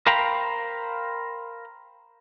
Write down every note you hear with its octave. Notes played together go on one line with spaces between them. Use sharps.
A#4 C5 F5 G5 A#5 B5